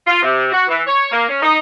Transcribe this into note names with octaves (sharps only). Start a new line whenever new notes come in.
F4
C3
F#4
E3
C#5
A#3
C#4
D#4